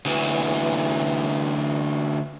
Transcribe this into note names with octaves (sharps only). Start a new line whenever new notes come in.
D2 E3